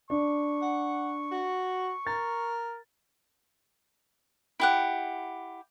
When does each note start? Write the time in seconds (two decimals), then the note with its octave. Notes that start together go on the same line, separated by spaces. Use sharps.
0.10 D4 C#6
0.62 F#5
1.32 F#4
2.07 A#4 A6
4.60 E4 G4 F#5